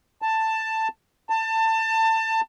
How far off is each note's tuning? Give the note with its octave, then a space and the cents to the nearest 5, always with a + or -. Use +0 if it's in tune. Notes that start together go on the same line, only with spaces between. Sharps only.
A5 +10
A5 +25